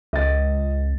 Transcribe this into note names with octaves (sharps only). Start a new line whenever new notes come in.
C#2 D#5 A6